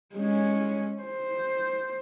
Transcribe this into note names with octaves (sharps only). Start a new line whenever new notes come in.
G#3 C#4
C5